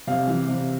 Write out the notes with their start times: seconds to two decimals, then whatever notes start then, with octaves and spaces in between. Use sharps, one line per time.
0.07 C3 F5
0.27 E3
0.48 C3